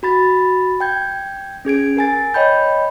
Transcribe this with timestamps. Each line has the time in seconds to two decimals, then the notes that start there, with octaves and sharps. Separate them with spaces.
0.03 F#4 B5 A6
0.80 G5 G6 G#6
1.65 C#4 G#4 G#6 D7
1.97 A#4 G#5 A6
2.34 C#5 D#5 G5 B5 G6